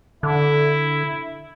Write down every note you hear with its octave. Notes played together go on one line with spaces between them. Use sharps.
D3 E4